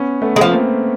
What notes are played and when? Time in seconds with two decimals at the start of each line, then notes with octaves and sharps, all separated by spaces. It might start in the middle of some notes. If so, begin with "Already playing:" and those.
Already playing: B3 C#4
0.22 A3 B3
0.36 G#3
0.41 F3
0.51 A#3 C4